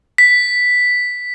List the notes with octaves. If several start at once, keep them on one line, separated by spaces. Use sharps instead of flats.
B6